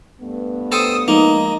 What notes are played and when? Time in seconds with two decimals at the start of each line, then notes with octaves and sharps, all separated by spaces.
0.21 G2 A3 B3
0.72 A4 C5 G5 D#6
1.08 F3 G#3 A#3 D#4 D#5